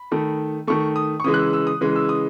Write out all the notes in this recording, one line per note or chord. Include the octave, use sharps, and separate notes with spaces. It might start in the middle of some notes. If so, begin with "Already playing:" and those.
Already playing: B5
D#3 A3
D#3 A3 C#6
D#6
C#6
C#3 E3 G#3 D#6
F#6
E6
E6
D#6
C#3 E3 G#3
E6
D#6